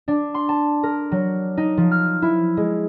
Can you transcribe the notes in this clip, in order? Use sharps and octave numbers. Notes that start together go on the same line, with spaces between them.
D4
C6
A5
A#4
F#3
D#4
F3
F6
E4
G#3